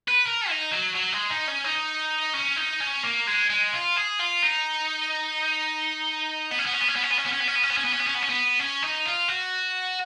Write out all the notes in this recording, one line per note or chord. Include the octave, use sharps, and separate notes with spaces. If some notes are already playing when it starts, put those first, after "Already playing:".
B4
A#4
D#4
F#3
F#3
G#3
D#4
C#4
D#4
C#4
D#4
C#4
A#3
G#3
G#3
F4
G#4
F4
D#4
B3
C#4
B3
C#4
B3
C#4
B3
C#4
B3
C#4
B3
C#4
B3
C#4
B3
C#4
B3
C#4
B3
C#4
B3
C#4
B3
C#4
B3
C#4
D#4
F4
F#4